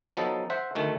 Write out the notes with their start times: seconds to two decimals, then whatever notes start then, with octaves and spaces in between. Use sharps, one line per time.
0.17 F3 F#3 B3 D#4 A4
0.50 C5 E5 F#5
0.75 D2 D#3 A3